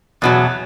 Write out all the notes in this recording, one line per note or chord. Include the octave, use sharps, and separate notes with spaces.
E2 B2 F#3